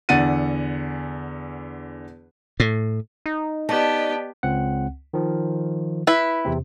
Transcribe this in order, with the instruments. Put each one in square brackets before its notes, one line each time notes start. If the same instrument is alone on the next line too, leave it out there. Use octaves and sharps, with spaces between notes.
[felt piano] E2 D3 F#5 G#5 A6 D#7
[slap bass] A2
[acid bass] D#4
[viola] B3 G4 [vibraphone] D5 D#5 [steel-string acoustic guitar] A5
[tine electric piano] C#2 C4 F#5
D#3 F3
[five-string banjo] E4 B4
[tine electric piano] E2 C3 C4